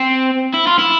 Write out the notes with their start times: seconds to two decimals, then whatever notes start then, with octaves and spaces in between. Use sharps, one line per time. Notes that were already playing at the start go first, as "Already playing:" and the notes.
Already playing: C4
0.54 E4
0.67 F4
0.78 E4